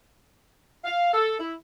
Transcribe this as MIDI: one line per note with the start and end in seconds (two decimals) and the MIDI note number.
0.84 1.12 77
1.13 1.39 69
1.39 1.53 64